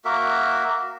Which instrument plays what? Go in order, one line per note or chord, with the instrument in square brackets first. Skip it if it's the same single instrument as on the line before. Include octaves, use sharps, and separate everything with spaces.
[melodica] A#3 F#4 A#4 E5